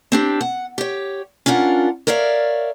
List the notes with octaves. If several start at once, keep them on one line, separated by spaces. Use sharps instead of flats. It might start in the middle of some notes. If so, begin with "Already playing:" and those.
C4 D4 G4
F#5
G4 C#5
C#4 D4 F4 A#4 F#5
A#4 C#5 D5 E5 F5